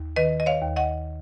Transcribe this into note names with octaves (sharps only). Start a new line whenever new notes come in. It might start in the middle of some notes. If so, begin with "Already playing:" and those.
Already playing: D#2
D#3 B4 D#5
D#5
C#5 F5
D#2
D#5 F#5